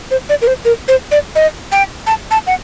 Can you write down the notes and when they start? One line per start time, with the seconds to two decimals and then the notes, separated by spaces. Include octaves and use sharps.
0.11 C5
0.29 D5
0.42 A#4
0.47 C5
0.65 A#4
0.88 C5
1.11 D5
1.35 D#5
1.72 G5
2.07 A5
2.31 A5
2.47 F#5